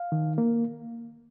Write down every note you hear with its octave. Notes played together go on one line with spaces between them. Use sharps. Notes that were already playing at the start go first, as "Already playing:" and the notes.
Already playing: F5
D#3
A#3